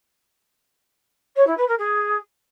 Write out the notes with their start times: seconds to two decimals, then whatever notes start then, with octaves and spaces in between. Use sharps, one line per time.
1.36 C#5
1.46 E4
1.57 B4
1.68 A#4
1.78 G#4